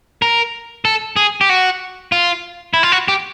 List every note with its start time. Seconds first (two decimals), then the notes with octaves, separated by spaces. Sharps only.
0.22 A#4
0.85 A4
1.16 G#4
1.41 G4
1.49 F#4
2.12 F4
2.74 E4
2.83 F4
2.92 F#4
3.08 G4